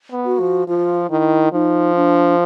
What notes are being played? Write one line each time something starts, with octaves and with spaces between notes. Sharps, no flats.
B3
F#4
F3
F3 F4
D#3 E4
F3 D#4
D4